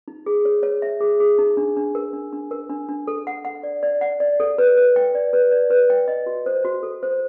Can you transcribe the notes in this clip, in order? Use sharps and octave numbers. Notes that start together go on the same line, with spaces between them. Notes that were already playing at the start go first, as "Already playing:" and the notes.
D#4
G#4
C#5
C#5
E5
G#4
G#4
D#4
D4
D4
A#4
D4
D4
A#4
D4
D4
A4
F#5
F#5
D5
D5
F#5
D5
A4
B4
B4
G5
D5
B4
D5
B4
G5
D#5
F#4
C5
F#4
A4
C5